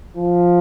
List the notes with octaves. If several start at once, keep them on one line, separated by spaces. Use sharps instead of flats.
F3